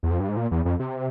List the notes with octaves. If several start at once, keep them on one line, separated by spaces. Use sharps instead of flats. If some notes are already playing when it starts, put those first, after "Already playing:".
E2
F2
G2
G#2
A#2
E2
F2
C3